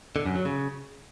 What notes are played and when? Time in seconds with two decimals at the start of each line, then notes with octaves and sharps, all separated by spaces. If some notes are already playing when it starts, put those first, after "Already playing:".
0.16 D3
0.26 F#2
0.35 F#3
0.45 C#3